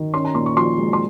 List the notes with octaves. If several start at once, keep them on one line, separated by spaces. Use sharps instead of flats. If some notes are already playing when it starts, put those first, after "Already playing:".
Already playing: D#3
C#4 C6
A#5
A#2 C6
C#6
F3 C6
G#3
C6